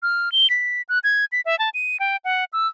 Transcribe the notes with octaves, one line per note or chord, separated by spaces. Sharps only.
F6
G7
B6
F#6
G#6
B6
E5
A5
D#7
G5
F#5
E6